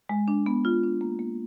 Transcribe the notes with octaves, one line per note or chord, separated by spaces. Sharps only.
G#3
D4
B3
F4
D4
A#3
A#3